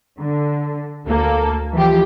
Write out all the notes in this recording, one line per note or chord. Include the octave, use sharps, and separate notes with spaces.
D3
D2 A#3 A4
E3 F3 G4